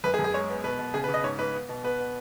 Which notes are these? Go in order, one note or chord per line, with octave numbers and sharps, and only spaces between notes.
F#2 B4
G#4
F#2
G#4
G#3 C#5
B3
B2 B4
B2
C#3 G#4
B4
C#3
D#5
G#2 C#5
G#2 B4
B3
B2
B3 B4
B3